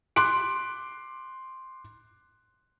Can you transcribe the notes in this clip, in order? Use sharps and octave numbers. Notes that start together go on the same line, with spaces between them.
C6 D6 F#6 D7